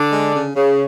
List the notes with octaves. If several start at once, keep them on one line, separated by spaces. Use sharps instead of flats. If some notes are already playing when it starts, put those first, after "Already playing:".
Already playing: D3 D4
G#3
C#3
C#3